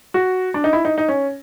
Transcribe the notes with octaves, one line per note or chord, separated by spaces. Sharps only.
F#4
D4
D#4
E4
D#4
D#4
C#4